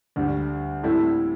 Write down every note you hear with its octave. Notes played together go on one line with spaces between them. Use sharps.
D2 D3 G3
A2 G3 C4 E4 A4